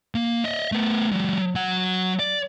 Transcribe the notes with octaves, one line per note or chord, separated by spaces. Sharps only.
A#3
D#5 E5
A3 B3
F#3 G#3
F#3 F#5
D5